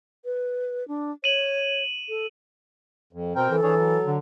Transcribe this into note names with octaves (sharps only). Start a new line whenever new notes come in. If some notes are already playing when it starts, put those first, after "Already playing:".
B4
D4
C#5 D#7 E7 F#7
A4
F2
B2 C4 A#4 G5
E3 A4
E3 D4 G#4 C#5
F#3
D3